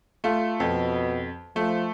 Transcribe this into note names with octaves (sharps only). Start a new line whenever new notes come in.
A3 F4
F2 B2
F3 A3